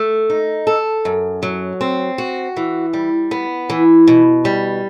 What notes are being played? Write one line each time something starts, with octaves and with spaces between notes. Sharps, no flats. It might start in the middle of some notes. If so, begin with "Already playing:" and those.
Already playing: A3
D#4
A4
F#2
F#3
C4
F#4
E3
G3
B3
E3
B2
G3